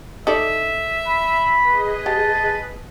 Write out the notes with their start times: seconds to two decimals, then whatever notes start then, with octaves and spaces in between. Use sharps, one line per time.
0.27 D#4 A4 D5 E5
1.07 B5
1.66 G#4 B4 D#5
2.06 G4 A5